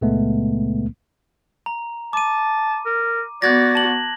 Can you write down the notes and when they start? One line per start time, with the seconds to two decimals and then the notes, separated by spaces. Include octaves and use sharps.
0.01 C#2 A#2 C#3 G#3 A3 B3
1.66 A#5
2.13 A5 D6 D#7
2.86 A#4
3.42 B3 F#4 D5 F#6 G#6 A#6
3.75 A5 F#7